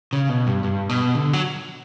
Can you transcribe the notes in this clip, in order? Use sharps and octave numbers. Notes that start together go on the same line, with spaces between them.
C#3
B2
G2
G2
B2
D3
F#3